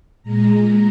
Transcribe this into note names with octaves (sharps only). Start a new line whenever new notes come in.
A#2 G#3 A#5